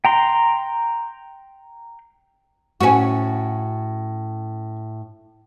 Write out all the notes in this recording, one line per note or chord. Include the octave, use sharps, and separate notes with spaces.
G5 A#5 C6
A2 C#4 F#4 G#5